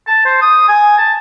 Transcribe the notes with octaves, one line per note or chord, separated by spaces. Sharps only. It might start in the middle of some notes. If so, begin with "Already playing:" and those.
A5
C5
D#6
G#5
A5